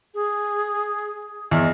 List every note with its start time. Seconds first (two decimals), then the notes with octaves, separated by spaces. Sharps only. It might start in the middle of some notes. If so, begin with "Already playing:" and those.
0.14 G#4
1.51 E2 D#5